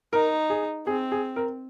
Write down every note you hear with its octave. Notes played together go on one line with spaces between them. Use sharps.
D#4 A#4
G#4
C4 G#4
G#4
A#4